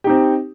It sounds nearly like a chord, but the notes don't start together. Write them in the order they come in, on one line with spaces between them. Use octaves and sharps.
G4 D#4 C4